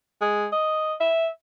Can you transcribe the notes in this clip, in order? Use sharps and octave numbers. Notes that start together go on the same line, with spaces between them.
G#3
D#5
E5